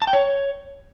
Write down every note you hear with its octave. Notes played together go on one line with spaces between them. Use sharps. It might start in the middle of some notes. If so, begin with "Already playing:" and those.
A5
G5
C#5